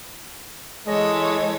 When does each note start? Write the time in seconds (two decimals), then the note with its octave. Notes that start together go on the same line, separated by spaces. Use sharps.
0.87 E3 G#3 A4 C#5 D#5
1.21 D#5